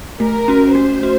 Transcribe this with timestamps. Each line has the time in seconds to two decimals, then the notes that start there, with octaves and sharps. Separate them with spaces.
0.20 A3 A#4
0.48 C#4 F#4
0.75 A3 C5
1.03 F#4